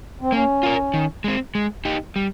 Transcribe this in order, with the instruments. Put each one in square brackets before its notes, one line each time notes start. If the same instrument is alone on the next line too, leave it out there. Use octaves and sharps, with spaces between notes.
[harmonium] C4
[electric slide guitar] A#3 [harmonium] C#4
[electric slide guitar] F4 A#4
D#3
G#3 C4
G#3
D#4 G4
G3